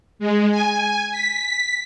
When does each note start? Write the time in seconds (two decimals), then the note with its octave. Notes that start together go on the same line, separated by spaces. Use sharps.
0.19 G#3
0.51 G#5
1.11 B6